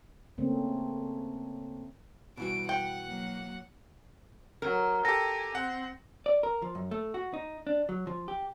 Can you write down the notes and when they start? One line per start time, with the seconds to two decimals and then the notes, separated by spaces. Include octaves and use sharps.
0.38 C#3 A3 A#3 C4 C#4
2.37 B2 E3 G3 F#4 D7
2.69 F#5 G5
3.05 F#3 A#3
4.62 F#3 A#4
5.05 G4 A4 G#5 A#6
5.55 C4 F#5
6.26 D5
6.43 A#4
6.62 F3
6.75 F#2
6.91 A3
7.14 F#4
7.34 D#4
7.67 D4
7.89 F#3
8.07 F3
8.28 G4